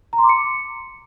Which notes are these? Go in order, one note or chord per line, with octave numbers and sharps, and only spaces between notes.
A#5
C6
D6
C#7